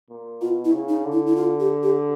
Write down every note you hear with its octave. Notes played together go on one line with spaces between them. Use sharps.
A#2
B2 F4
E4
C#3
D#4
D3
E4
E4
F4
G4
G4